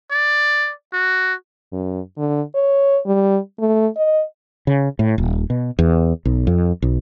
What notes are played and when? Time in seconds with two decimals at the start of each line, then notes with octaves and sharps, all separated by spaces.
0.11 D5
0.93 F#4
1.72 F#2
2.17 D3
2.55 C#5
3.06 G3
3.59 A3
3.96 D#5
4.67 C#3
4.99 A2
5.18 D#1
5.50 B2
5.79 E2
6.25 B1
6.47 F2
6.82 B1